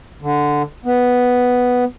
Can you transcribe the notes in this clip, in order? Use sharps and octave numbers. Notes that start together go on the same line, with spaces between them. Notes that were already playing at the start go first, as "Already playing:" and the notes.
D3
B3